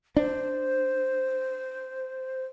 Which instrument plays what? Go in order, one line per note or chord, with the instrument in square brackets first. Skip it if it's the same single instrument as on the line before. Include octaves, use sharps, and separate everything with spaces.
[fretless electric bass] D4 [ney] C5